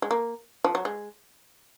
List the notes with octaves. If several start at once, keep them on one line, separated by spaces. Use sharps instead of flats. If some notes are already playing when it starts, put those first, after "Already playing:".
G#3
A#3
F3
F#3
G#3